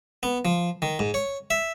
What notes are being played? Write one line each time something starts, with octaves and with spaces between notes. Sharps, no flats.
B3
F3
D#3
G#2
C#5
E5